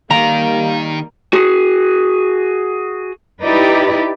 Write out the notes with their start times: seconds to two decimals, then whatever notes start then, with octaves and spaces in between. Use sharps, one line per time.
0.11 D#3 G3 A#3 F5 A#5
1.33 F#4 G#4
3.43 D#4 E4 G4 B4 D5